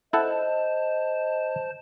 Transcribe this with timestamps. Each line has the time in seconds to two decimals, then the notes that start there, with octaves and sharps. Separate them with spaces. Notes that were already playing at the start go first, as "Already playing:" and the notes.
0.13 E4 A4 C5 D#5 F#5 A5